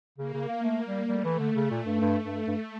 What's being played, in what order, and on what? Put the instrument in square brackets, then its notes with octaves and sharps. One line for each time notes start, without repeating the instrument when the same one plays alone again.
[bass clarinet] C#3 [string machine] A#3
[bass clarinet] C#3
A#3
[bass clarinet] A3 [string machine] A#3
[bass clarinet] G3
[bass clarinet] G3 [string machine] A3
[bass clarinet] E3
D3
[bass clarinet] C#3 [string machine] A3
[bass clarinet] A#2
G2
[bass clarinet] G2 [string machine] A3
[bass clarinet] G2
G2